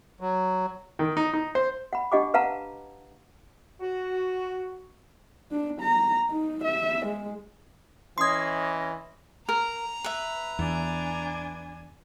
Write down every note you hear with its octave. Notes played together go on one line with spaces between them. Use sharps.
F#3
D#3
D#4
D#4
C5
F#5 B5
D4 G4 D#5 F#5 G#5 D6
B4 F5 F#5 A5 A#5
F#4
D4
A#5
D#4
E5
G#3
E3 C#4 D#5 C6 D#6 G#6 C7
A#4 A#5
B4 E5
E2 D4 G#5